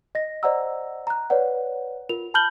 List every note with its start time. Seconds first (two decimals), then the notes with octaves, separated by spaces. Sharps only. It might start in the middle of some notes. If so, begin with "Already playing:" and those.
0.15 D#5 A#6
0.43 C5 D5 D#5 F#5 A#5 E6
1.07 A#5 F#6
1.30 B4 C#5 D5 F#5
2.09 F4 A#4 F7
2.34 A5 B5 F6 G6 F#7 G7